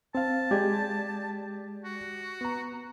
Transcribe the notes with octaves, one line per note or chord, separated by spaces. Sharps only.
C4 F5 A5
G#3 G4 D5 G#6
F#4
B3 A#5